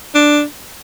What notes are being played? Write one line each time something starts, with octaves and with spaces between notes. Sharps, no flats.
D4